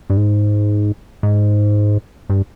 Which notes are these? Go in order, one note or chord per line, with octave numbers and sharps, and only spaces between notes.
G2
G#2
G#2
G2